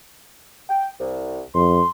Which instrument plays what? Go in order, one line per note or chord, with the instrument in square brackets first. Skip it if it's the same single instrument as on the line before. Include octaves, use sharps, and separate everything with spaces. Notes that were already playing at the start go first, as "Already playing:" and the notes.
[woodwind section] G5
C2
[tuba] F2 [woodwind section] C6